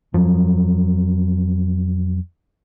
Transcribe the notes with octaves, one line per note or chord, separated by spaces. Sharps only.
F2 F3 F#3